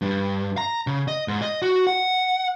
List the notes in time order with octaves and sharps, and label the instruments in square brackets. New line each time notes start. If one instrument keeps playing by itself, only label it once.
[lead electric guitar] G2
A#5
C#3
D#5
G#2
D#5
F#4
F#5